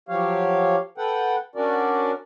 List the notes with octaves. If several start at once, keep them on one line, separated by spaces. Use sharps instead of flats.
F3 F#3 G4 C#5 F5
A4 B4 F#5 G5
C#4 D4 F#4 A#4 D5